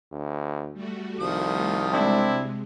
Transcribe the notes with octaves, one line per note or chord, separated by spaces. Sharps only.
D2
G3 A3 F#4
C2 D#3 F3 D#6
C3 G#3 C4 D4 E4